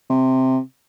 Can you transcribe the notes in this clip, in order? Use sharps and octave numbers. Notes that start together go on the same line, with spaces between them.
C3